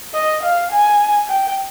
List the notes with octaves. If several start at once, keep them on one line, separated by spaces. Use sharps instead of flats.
D#5
F5
G#5
G5